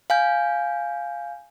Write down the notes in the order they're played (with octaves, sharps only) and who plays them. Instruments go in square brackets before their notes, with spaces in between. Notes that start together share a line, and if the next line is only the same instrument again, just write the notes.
[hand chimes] F5 G#5 G6